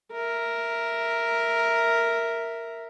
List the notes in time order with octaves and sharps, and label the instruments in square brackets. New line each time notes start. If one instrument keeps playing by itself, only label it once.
[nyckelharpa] A#4 E5